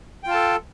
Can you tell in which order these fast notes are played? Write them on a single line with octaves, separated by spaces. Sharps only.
G5 F4 A5 A4